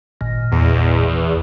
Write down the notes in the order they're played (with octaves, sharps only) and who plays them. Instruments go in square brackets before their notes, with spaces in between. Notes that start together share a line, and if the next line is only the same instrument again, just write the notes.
[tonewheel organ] G#1 A#2
[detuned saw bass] E2